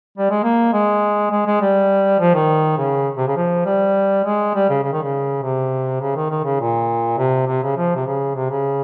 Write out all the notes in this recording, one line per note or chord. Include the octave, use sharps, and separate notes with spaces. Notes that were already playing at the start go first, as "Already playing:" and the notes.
G3
G#3
A#3
G#3
G#3
G#3
G3
F3
D#3
C#3
C3
C#3
F3
G3
G#3
G3
C#3
C#3
D#3
C#3
C3
C#3
D#3
D#3
C#3
A#2
C3
C3
C#3
F3
C3
C#3
C3
C#3